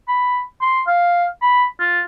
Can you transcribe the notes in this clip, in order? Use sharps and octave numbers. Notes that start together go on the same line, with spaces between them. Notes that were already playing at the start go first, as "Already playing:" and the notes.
B5
C6
F5
B5
F4